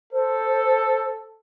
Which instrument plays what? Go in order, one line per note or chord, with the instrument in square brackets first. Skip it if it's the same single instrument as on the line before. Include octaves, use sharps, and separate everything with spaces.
[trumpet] A4 [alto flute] C5